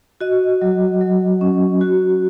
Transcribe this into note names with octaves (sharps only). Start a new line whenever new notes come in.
F#4 D#5
F#3
F#3
C#4
F#4